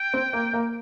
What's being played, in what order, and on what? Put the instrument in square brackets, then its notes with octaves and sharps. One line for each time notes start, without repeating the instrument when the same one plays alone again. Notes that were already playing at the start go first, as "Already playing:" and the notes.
Already playing: [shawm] G5
[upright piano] C4
A#3
A#3